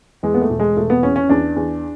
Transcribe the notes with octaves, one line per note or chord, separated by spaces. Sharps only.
E2 G#3
B3
A3
E1
G#3
E1 A3
B3
E2 C#4
C#4
E2 D4
E2